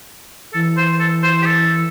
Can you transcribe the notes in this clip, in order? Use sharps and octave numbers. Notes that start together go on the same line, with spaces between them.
E3 A4
C5
A4
C5
G4
A4